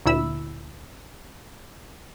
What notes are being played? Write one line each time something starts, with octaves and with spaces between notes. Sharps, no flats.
D2 A#2 E4 B5 E6